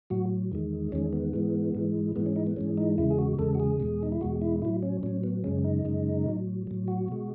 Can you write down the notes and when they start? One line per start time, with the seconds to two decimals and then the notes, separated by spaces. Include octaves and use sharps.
0.10 A2 F#3 F#4
0.52 E2 D#3 G#3
0.92 E2 D#3 G#3 C#4
1.13 B3
1.34 G#2 E3 G#3
1.75 G#2 E3 G#3
2.16 G#2 E3 G#3 B3
2.26 C#4
2.36 D#4
2.47 B3
2.56 G#2 E3 G#3 C#4
2.77 D#4
2.98 E2 C#3 G#3 E4
3.10 G#4
3.19 F#4
3.38 E2 C#3 G#3 A4
3.55 F#4
3.60 G#4
3.80 E2 B2 G#3
4.03 D#4
4.12 E4
4.21 E2 B2 G#3 F#4
4.41 E4
4.62 A2 F#3 E4
4.83 C#4
5.03 A2 F#3 C#4
5.23 B3
5.44 F#2 C#3 G#3 C#4
5.64 D#4
5.85 F#2 C#3 G#3
6.26 A2 F#3
6.67 A2 F#3
6.88 F#4
7.08 B2 G#3